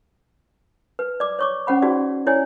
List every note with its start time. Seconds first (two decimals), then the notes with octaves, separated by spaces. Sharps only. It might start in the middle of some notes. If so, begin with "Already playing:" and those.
0.99 B4
1.20 D5 D6
1.39 C#5 C#6 D6
1.67 C#4 C5 F#5 B5
1.82 D#4 F#4 G#4 D5
2.27 E4 C#5 D5 G#5